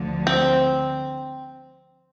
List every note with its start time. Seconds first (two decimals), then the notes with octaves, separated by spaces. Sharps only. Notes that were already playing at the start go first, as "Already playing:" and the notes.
Already playing: D2 D3 F3
0.27 C4